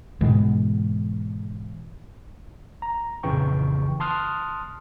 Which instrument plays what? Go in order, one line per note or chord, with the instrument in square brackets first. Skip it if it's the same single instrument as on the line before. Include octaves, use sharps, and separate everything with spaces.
[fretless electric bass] G#2 B2 E3 G#3
[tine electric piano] A#5
A#1 F2 C#3 E3 G5 C#6
A5 C6 D#6 F6 F#6